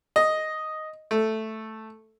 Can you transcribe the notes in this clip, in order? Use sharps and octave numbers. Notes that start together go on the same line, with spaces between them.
D#5
A3